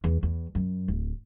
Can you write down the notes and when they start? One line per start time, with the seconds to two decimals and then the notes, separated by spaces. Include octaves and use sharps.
0.04 E2
0.23 E2
0.55 F#2
0.88 D1